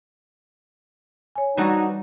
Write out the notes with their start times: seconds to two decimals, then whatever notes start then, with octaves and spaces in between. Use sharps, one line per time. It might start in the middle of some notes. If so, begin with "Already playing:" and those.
1.36 C#5 G#5
1.57 E3 G3 D4 D#4 F#4